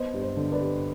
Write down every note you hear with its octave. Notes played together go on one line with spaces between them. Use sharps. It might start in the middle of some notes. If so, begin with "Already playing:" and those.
Already playing: B3 C5 D#5
G2
C5
D3
B4 D5
G3